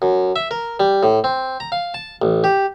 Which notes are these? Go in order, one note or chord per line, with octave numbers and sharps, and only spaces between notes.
F#2
E5
A#4
G3
A2
C4
A#5
F5
A5
A1
G4